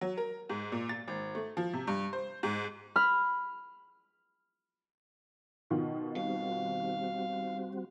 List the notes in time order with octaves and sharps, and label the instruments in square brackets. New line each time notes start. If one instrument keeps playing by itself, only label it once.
[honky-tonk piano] F#3
A#4
G#2
A#2
A6
G#1
A3
F3
C3
G2
C5
G#2
[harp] B5 F6
[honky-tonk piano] B2 D#3 F4 [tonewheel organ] D#4
[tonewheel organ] G3 C4 F#4 [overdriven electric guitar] F5